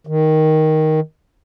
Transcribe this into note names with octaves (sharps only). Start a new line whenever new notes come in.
D#3